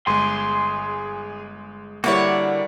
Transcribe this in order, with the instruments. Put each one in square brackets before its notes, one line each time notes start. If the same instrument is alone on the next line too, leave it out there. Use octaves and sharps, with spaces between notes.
[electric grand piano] G1 G#3 [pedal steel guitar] G#4 [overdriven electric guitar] C6
[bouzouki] D3 E4 C#5 [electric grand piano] G3 A#3 [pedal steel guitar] F#4 D5